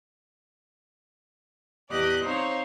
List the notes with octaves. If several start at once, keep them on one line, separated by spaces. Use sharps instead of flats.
E2 G4 D5 D#5 F#6
C4 D#4 C5 C#5 F5